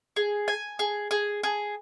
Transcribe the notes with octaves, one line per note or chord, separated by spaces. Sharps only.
G#4
G#5
G#4
G#4
G#4